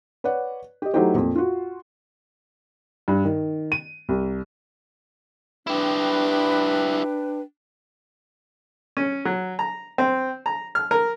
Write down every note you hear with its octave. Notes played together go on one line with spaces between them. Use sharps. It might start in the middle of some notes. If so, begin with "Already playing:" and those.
B4 C#5 D5 F#5
G4 D#5
F#3 A3 D#4 E4 G4 C5
F2 A#2
F4 F#4
G2
D#3
D#7
C2
D4 E4 G4 B4 G5
C#4
F#3
A#5
C4
A#5
F6
A#4